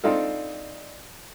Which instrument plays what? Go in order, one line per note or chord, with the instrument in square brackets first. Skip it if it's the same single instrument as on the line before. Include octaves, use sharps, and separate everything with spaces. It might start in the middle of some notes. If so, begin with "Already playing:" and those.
[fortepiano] C4 D4 D#4 F4 A4